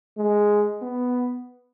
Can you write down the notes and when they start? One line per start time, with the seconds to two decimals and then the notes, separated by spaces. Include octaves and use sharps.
0.17 G#3
0.82 B3